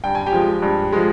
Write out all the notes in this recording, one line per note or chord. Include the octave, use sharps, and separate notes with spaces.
G2 G5
G#5
G4 G5
F3 G#3
G2
F3 G#3